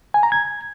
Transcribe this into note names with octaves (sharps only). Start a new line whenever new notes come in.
G#5
A#5
G#6